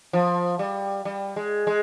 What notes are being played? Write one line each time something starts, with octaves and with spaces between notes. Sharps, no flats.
F3
G3
G3
G#3
G#3